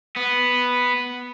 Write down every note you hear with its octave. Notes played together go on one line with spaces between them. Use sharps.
B3